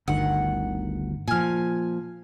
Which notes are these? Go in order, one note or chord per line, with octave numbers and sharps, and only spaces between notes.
G1 D2 D#3 F#5
A#2 F3 G#5 F6